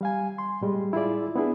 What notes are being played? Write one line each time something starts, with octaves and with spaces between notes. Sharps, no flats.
G3 F5 G#5
C6
A2 G3 G#3
E4 F4 G#4 D5
B3 D4 E4 G#4